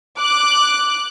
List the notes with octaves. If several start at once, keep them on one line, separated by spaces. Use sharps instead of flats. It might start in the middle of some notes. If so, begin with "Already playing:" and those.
D6 F#6